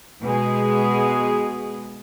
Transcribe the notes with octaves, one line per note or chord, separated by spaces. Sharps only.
B2 G#3 G#4